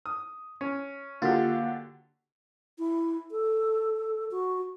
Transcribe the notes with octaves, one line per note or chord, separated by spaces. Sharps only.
D#6
C#4
D3 F#3 A#3 F4 G4 F#5 A6
E4
A4
F#4